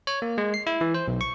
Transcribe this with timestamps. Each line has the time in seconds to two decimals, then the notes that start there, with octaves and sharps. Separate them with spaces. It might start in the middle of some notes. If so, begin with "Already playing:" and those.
0.07 C#5
0.22 A#3
0.38 G#3
0.54 C7
0.67 E4
0.81 E3
0.94 C5
1.08 B1
1.21 C#6